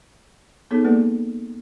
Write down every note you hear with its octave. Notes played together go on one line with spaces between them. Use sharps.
B3 D#4 G#4 A4 C#5
G#3 A#3 G#4 A4 B4 D5